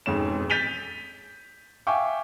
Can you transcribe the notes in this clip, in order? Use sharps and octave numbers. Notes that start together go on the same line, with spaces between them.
E1 F2 G#2 C#4 E7
G6 A6 B6 D#7 F7 G7
E5 F5 G5 G#5 C#6 D6